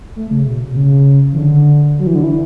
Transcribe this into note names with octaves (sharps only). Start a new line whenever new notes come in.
A3
C#3
B2
B2
C#3
E3
D3
F#3
E3
D3
E3